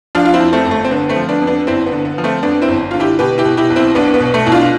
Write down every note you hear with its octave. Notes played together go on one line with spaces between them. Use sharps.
F3 D4 F4
F4
C4 E4
F2
A3 C4
G1
A3
C4
D3 B3
A3 C4
F3
B3 D4
F2
B3 D4
G1 C4 E4
B3
D3
B3
F3
A3 C4
F2 B3 D4
C4 E4
G1
D3 F4
E4 G4
B2 G4 B4
E4 G4
B2
E4 G4
B1
C4 E4
B1 B3 D4
B3
B2
A3
B2 E4
D4 F4